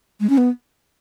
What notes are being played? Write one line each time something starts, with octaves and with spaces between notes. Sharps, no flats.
G#3
C#4
B3